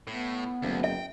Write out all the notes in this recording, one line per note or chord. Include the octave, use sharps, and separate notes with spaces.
A2 B3
F#1 D2
E5 G5